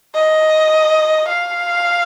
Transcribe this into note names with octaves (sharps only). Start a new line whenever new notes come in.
D#5
F5